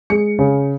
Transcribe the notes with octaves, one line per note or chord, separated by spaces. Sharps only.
G#3 C#7
C#3